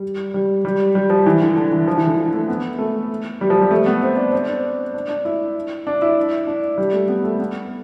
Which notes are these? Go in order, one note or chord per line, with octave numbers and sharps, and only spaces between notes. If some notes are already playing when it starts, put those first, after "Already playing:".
Already playing: G3
G3
G3
G3
F3
E3
D3
D3
E3
F3
E3
D3
F3
A3
B3
A3
G3
F3
G3
A3
B3
C4
D4
C4
D4
D4
D4
E4
D4
E4
D4
G3
A3
B3
A3
B3